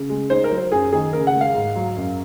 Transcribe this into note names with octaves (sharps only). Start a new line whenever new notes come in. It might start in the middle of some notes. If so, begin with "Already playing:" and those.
Already playing: C#3
G#3
D#4 C5
A#4
F#3
C5
F#2 G#4
D#3 G#4
C#3 A#4
F#5
G#3
F5
G#2
F#3
F#2